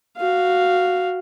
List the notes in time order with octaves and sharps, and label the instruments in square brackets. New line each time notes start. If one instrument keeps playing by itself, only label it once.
[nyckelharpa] F#4 F5